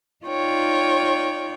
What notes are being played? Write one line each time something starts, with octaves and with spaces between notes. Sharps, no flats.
D#4 F4 C#5 D5 G5